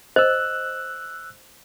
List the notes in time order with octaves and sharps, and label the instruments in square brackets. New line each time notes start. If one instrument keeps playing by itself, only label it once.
[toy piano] C5 D#5 [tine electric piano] E6 F#6